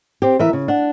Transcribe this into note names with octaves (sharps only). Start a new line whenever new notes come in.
C4 G4
E3 A#4 E5
C#3
D4 F#5